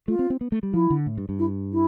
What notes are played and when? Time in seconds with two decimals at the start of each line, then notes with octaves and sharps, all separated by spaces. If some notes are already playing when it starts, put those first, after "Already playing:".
0.08 A3 F4
0.19 C4
0.30 C4
0.41 B3
0.52 A3
0.63 G3
0.73 F3 E4
0.90 D3
1.06 A2
1.17 G2
1.29 G2
1.39 E4
1.72 E4